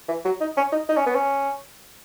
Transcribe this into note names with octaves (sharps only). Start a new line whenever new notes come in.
E3
F#3
D#4
C#4
D#4
D#4
C#4
B3
C#4